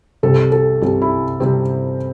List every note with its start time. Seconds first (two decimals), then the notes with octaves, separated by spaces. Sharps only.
0.23 C2 C3 G3 A4
0.52 A4
0.82 C2 C3 G3
1.02 E4
1.40 C3 G3 C4